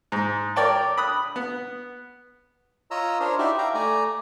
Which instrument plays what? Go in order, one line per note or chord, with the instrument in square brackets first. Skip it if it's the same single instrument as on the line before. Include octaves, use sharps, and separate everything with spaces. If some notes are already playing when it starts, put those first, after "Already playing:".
[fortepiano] G#2
A#4 C#5 D5 G5 A5
B5 D#6 F#6
B3
[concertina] F4 C#5 D#5 A#5 E6
D4 A#4 C5 C#5
D#4 E4 F#4 G4 D5 E5
E5 F5 G5 A#5
A3 D5 G#5 A#5